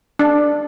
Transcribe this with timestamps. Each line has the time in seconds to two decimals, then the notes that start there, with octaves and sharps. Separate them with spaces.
0.19 D4